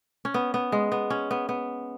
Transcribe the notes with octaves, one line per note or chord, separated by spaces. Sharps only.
C#4
B3
B3
G#3
B3
C#4
B3
B3